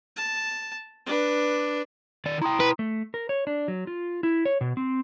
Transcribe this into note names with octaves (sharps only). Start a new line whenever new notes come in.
A5
D4 B4
D#3 D5
E4 G5 A#5 C6 D#6
B4
A3
A#4
C#5
D4
F#3
F4
E4
C#5
B2
C4